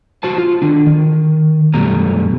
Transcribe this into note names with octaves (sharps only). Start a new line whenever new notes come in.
F#4 C5 A5
F4
D#3 D4
D#3
F#2 B2 G3 A3 A#5